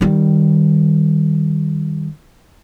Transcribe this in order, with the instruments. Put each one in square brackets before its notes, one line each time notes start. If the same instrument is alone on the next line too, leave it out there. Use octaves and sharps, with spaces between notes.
[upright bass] D#3 G3